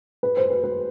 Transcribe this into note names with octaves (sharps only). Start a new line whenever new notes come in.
B4
C5
B4
B4